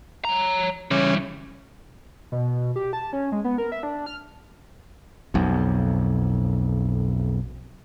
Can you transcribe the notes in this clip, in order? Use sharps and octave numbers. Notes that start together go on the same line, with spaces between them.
C#5 A#5
C#3 E3 G3 C#4
B2
G4
A5
C#4
G#3
B3
A#4
E5
D4
F6
B1 F2